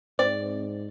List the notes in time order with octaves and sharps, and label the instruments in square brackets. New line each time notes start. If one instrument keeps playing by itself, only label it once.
[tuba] G#2 [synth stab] C4 [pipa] D5